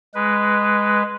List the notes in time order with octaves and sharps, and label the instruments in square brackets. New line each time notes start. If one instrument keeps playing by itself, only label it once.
[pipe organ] G#3 B4